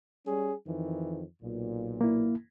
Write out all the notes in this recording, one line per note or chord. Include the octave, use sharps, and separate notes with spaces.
G3 C#4 G#4
F2 D#3 E3
B1 A#2
A#3 E4